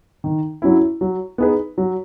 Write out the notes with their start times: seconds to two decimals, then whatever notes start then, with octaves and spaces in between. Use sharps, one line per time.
0.24 D#3
0.62 F#3 C#4 E4
1.01 F#3
1.38 B3 D#4 G#4 B4
1.78 F#3